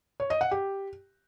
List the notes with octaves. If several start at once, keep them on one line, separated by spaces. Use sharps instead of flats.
C#5
D#5
F#5
G4